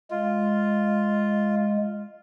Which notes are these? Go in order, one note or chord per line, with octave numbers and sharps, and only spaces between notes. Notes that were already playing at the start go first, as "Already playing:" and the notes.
G#3 F4